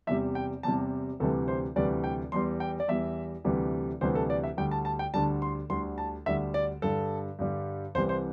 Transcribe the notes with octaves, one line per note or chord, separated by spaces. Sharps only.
E2 C3 G3 E5
G5
E2 C3 G3 A5
D2 C3 E3 G3 A4
C5
D2 C3 E3 G3 D5
G5
E2 E3 G3 C6
G5
D5
E2 E3 G3 E5
D2 C3 E3 G3
D2 C3 E3 G3 C5
A4
D5
E5
D2 D3 G3 G5
A5
A5
G5
D2 D3 G3 A5
C6
D2 D3 G3 C6
A5
D2 D3 G3 E5
D5
G2 D3 G3 A4
G2 D3 G3
C2 C3 E3 G3 C5
C5